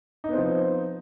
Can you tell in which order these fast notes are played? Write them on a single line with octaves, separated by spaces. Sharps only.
D#4 B3 C4 F3